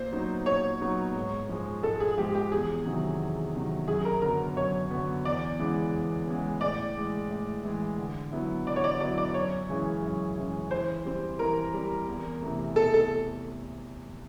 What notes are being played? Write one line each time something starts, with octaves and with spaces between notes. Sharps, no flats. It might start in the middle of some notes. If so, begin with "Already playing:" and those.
Already playing: A#2 C5
F#3 B3 D#4
A#2 C#5
F#3 B3 D#4
G#2
F3 G#3
G#2 A4
G#4
F3 G#3 G4
G4
E2 G#4
C3 D#3 F#3
E2
C3 D#3 F#3
F#2 G#4
A#4
D3 F#3 B3 A#4
F#2 C#5
D3 F#3 B3
E2 D5
C#3 E3 G#3 B3
E2
C#3 E3 G#3 B3
A2 D5
E3 G#3
A2
E3 G#3
D3
F#3 B3 E4
D3 D5
C#5
D5
F#3 B3 E4 D5
D5
F#2 C#5
C#3 E3 G#3
F#2
C#3 E3 G#3
E3 C5
G3 C4
E3 A#4
G3 C4
E2
C3 E3 A3
E2 A4
A4